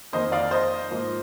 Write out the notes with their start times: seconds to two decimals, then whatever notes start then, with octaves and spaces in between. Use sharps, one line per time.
0.13 F2 D#3 A#3 C5 D#5
0.32 D5 F5
0.51 C5 D#5
0.90 G#2 F3 A#3